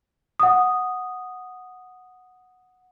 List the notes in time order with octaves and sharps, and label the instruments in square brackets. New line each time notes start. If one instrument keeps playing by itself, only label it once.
[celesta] F#5 D#6